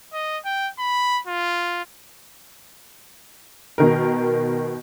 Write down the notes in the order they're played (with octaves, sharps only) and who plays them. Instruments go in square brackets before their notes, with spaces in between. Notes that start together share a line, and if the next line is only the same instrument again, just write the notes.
[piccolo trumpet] D#5
G5
B5
F4
[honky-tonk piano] B2 D#3 A#4